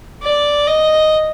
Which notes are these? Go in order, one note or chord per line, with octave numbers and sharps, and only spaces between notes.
D5
D#5